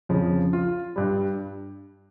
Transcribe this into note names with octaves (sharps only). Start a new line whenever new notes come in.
F2 C#3 F3
F4
G2 G3